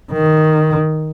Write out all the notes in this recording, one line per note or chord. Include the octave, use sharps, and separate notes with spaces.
D#3